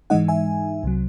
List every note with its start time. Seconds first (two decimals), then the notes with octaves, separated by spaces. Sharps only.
0.10 G#2 E3 G#3 D#4 D#5 F#5
0.28 E5 G#5
0.83 C2 C3 F#3